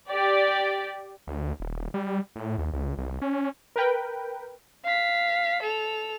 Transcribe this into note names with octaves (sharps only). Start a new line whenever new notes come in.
G4 D5
D2
D#1
G3
A2
D#2
C#2
C2
C#4
A#4 B4 G5
F5 B6
A4 F7